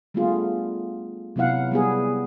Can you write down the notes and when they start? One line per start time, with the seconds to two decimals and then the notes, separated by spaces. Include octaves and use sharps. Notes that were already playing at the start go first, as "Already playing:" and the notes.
0.14 G3 A3 B3 D4 F4 G#4
1.36 C3 F#3 B3 E4 F5 F#5
1.71 G3 B3 G#4